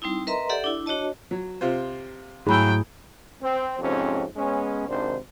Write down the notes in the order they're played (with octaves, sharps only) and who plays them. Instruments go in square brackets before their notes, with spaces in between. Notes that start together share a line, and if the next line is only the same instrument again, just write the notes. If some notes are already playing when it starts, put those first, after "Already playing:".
[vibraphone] G3 C4 D#4 E4
A#4 B4 D#5 E5 A#5 C6
G4 A4 D5 E5 F#5
D4 E4
D4 F#4 C#5 D#5 A5
[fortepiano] F#3
C3 F4 C5
[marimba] G#2 B5 E6 [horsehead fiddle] F#3 G5 [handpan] A3 E4 G#4
[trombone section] C4
F2 G#2 C3 C4 C#4
G#3 B3 C#4
G#1 C3 D#3 D4 C5